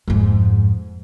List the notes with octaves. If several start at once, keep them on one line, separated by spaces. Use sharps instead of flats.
F2 G#2